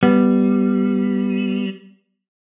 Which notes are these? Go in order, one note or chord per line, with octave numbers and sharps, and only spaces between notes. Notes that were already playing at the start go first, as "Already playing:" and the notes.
G3 B3